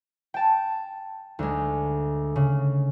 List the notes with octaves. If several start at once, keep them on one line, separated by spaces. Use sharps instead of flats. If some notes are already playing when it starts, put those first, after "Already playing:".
G5 A5
D2 G#3
C#3